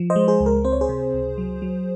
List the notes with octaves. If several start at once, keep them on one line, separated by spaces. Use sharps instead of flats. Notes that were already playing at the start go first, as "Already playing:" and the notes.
Already playing: F3
C5 D#5
G#3
G#4 C5
C#2
A#4
C4 C5
C#5
G#4 C5
C3
C#2
F#3
F#3